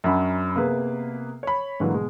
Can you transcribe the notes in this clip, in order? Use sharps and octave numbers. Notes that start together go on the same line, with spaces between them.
F#2 F#3 D4 G#5 B5
C3 A#3 B3 G#4 B4
C#5 B5
G#2 D3 E3 F#3 A#3
B2 G#3